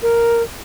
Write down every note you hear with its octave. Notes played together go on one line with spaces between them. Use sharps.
A#4